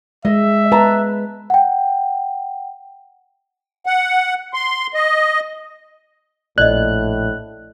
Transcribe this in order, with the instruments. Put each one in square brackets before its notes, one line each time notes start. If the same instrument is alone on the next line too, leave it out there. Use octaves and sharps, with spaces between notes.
[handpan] G#3 [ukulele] D#5 [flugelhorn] E5
[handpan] B4 [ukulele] A5 A#5
[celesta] F#5 G5
[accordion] F#5
C6
D#5
[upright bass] A#1 [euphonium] A2 [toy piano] D5 D#5 [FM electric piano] F#6